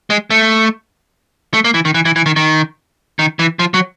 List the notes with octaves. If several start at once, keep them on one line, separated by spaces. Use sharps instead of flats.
G#3
A3
A3
A#3
E3
D#3
E3
E3
E3
D#3
D#3
D#3
E3
F3
F#3